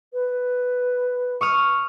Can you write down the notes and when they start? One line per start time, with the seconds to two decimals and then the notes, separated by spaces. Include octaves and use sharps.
0.13 B4
1.41 C#6 D#6 F6